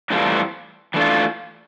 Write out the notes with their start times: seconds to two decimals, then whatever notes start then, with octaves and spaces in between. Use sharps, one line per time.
0.10 A2 E3 G3 C4 F4
0.94 E3 A3 D4 F4